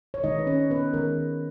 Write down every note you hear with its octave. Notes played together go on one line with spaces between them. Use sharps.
C#5
D#3 G#3 D#4 D#5
B4
C#4 C#5
B3 B4
D#3 G#3 A#4